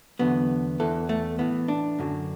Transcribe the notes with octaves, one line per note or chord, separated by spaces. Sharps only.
E2 D3 F#3 B3
E2 E3 A4
A3
A2 E3 B3
D4
F#2 D3 F#3